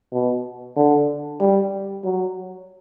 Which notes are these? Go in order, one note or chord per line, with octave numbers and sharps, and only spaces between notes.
B2
D3
G3
F#3